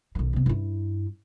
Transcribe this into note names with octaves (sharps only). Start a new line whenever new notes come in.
B1 D#3
C3 B3
G2 E4